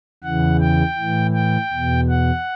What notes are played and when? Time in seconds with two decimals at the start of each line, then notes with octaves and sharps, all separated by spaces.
0.24 E2 C#3 E3 F#5
0.61 G5
0.98 A2 E3
1.34 G5
1.72 E2 B2
2.09 F#5